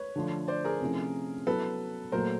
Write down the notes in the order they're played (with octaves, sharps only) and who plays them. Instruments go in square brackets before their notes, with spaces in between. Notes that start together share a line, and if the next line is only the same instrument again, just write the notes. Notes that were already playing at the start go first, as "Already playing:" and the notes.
Already playing: [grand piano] B4 C#5
[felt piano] D3 F3 A3
[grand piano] C5 D5
G#4 A#4
[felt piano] C3 F3 A3 C#4 E4
[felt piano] F#3 B3 E4 [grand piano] A4 B4
[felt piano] A#2 F#3 A3 [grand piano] A#4 C5